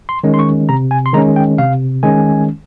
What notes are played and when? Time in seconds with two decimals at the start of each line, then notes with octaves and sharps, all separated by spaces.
0.09 C6
0.24 D#3 G#3 C#4
0.34 C6
0.39 C#6
0.69 C3 A#5
0.91 G#5
1.06 C6
1.13 D#3 G#3 C#4 A#5
1.36 G5
1.58 C3 F5
2.03 D#3 G#3 C#4 G#5